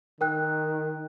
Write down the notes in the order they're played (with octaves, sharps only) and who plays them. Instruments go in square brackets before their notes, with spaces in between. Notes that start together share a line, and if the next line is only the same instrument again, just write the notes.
[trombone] D#3 [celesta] A#4 G5 F#6